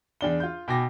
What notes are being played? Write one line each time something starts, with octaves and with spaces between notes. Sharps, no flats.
E2 D4 G7
F4 G6
B2 G5 G#5 D6 A#6